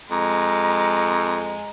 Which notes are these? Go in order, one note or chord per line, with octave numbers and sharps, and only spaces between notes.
F2 G#3 A#5